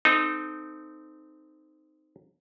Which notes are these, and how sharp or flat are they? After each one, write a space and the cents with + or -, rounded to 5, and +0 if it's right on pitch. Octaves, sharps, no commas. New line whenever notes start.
C4 -20 D#4 -10 A4 +0